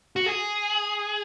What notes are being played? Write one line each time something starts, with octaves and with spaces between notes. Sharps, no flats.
F#4
G#4